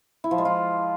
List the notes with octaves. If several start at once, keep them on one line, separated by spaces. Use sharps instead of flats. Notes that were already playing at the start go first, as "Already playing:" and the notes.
E4
F3
G#3
F4